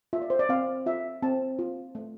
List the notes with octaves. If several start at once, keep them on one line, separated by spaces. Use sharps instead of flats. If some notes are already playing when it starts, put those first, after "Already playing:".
F4 E5
D5
C5
D5
C4 F5
F4 E5
C4 A5
F4
A3